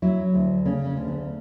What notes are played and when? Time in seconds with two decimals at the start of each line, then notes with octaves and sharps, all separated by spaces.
0.02 F#3 E4
0.34 D2
0.65 C#3 C#4
0.87 C#4
0.97 D2
1.08 B3